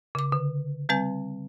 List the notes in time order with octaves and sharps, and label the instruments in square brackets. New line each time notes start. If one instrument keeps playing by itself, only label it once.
[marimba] C#3 D6
D3
G3 C4 B4 G#5